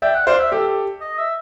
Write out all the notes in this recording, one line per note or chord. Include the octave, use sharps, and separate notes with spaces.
D5 E5 G5
F#5
C5 D5 F5
E5
G4 A4
D#5
E5